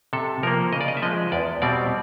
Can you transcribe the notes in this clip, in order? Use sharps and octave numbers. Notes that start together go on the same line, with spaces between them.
C3 A4
F3 A#3 A#4
C#3 D#5
D5
D#5
E5
F3 G#3 D#5
E2 D5
B2 G3 C4 D5